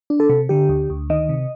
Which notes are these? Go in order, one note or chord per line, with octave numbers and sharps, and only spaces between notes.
D4
A4
C3
D3 G4
D2
D2
D#3 D#5
C3